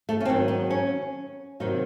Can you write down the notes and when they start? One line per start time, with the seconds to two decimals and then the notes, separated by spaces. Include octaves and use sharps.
0.09 A3
0.20 C#4
0.25 G#2 D#3 F#3 C4
0.48 D#4
0.70 C#4
1.60 C3 D#3 F#3 D#4